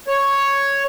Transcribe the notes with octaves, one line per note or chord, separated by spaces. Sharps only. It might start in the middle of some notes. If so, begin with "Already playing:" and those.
C#5